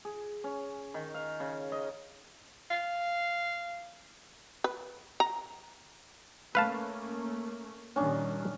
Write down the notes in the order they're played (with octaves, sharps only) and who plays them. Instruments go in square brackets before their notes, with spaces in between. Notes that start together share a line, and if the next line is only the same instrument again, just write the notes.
[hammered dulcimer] G#4
C#4
D#3
F5
C#3
D#5
[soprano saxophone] F5
[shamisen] B4
A#5
[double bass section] A3 A#3 C#4 [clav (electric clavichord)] B4 F5 A5
[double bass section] A#2 D#3 G3 [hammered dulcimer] C#4 D4